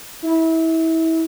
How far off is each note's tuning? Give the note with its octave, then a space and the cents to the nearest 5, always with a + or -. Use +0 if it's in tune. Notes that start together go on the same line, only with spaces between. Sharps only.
E4 -25